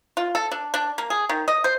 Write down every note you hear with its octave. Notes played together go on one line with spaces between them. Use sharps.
F4
A4
D4
D4
A#3
G#4
D#3
D#5
C5